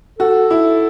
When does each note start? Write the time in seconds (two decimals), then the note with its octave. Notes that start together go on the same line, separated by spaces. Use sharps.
0.19 F#4 A4
0.50 E4